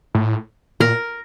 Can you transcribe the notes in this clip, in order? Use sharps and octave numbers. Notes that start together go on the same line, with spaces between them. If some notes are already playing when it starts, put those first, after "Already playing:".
A2
A#2 A#4